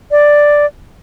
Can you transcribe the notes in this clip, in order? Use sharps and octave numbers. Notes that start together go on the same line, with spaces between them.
D5